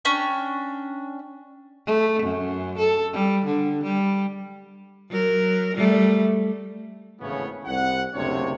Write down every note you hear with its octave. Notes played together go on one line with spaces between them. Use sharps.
C#4 D4 G5 C#6
A3
F#2
A4
G3
D3
G3
F#3 A#4
G3 A3
G#1 A2 C#3 E3 B3 C#5
C2 F#5
F#1 D2 C3 D4 C#5